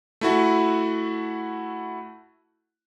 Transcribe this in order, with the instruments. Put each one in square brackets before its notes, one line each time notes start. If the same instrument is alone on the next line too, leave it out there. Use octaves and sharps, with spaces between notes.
[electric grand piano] A3 E4 F#4